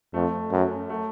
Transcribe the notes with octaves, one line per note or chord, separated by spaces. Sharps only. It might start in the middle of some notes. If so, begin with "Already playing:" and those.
F2 A3
F#2
A3